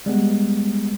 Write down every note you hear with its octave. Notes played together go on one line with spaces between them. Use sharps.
G3 G#3 B3